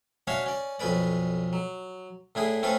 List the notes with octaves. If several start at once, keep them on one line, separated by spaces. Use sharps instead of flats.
C#4 D4 F#4 C#5 E5 F5
C#4 D5
B1 F2 C#4 B4 D5
F#3
A2 D4 E4 G#4
A3 C4 C#4 F4 A4 B4